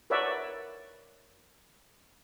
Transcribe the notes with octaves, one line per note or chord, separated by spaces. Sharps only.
A#4 B4 C#5 D5 E5 F#5